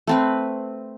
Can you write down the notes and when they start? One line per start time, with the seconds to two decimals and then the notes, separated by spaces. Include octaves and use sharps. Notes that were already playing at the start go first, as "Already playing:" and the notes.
0.07 A3 C4 B4